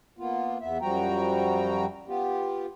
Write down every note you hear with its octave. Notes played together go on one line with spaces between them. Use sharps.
A#3 B3 F4
E2 B3 E5
F#2 F3 G3 F#4 G5 A#5
B3 F4 G4